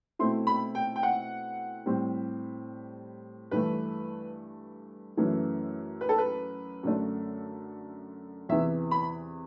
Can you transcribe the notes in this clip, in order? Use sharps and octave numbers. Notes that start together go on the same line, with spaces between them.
B2 A3 C4 E4 C6
B5
G5
G5
F#5
A2 G3 C4
G2 E3 A3 B4
F#2 E3 A3
B4
A4
B4
F#2 D3 A3 D4
E2 C3 E3 E5
B5